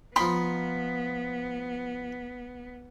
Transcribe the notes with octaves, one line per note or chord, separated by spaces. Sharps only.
F3 B3 D#4 G5 B5 C6